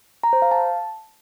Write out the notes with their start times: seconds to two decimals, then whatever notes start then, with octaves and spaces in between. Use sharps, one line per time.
0.24 A#5
0.33 C5
0.42 F5
0.51 A5